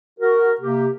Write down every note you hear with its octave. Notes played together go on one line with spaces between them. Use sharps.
F#4 A#4
C3 A#3 G4